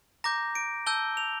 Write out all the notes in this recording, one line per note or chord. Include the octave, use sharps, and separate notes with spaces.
A#5 D6 G6 A#6
D7
A5 E6 G6 G7
F7